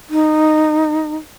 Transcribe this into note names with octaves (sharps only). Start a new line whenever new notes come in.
D#4